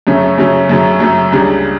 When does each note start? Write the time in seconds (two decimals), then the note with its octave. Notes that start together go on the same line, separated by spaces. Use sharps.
0.07 F#2 C#3 F#3 A3 C#4
0.38 F#2 C#3 F#3 A3 C#4
0.69 F#2 C#3 F#3 A3 C#4
1.00 F#2 C#3 F#3 A3 C#4
1.32 C#2 C#3 G3 D4